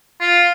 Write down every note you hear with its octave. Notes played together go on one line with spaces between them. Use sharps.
F4